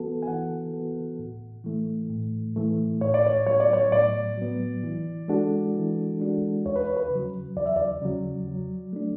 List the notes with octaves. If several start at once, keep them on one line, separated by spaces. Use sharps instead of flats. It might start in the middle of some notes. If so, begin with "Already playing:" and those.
Already playing: E3 B3 F#4 A4
G#5
E3 F#5
B3 F#4 A4
A2
E3 A3
A2
E3 A3
A2 C#5
D5
C#5
F#3 B3 C#5
D5
C#5
A2 D5
F#3 B3
E3
G#3 D4 F#4 A4
E3
G#3 D4 F#4 A4
E2 C#5
B4
C#5
B4
C#3 F#3
E2 D5
E5
D5
C#3 F#3
F#3
A3 D4